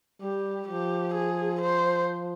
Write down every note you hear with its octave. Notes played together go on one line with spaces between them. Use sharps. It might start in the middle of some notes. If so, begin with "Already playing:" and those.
G3 G4
F3 G4
G#4
C5